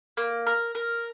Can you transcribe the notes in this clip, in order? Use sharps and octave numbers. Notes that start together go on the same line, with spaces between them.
A#3
A#4
A#4